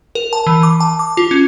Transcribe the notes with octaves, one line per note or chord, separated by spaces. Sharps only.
A#4
A5
E3
D6
A5
D6
F4
C#4